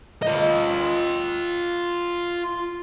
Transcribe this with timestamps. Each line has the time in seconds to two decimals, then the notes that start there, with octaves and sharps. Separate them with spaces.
0.23 F4 D#5